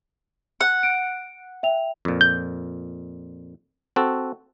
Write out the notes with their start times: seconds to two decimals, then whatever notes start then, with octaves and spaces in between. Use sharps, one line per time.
0.61 F#5
0.83 D7
1.63 E5 G5 F7
2.05 F2 A#2
2.21 G6
3.96 C4 F#4 A4